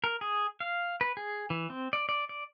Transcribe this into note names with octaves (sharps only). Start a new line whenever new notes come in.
A#4
G#4
F5
B4
G#4
E3
C4
D5
D5
D5